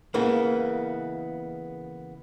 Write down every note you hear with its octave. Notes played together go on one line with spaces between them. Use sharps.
C#3 E3 G#3 A#3 B3